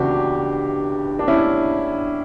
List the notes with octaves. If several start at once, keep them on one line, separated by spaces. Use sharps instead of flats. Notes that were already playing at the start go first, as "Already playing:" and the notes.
Already playing: C#2 C#3 E3 D4 F#4 G4
D4
C#4 E4